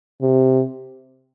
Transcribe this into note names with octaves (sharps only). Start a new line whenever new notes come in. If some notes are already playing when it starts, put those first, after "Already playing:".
C3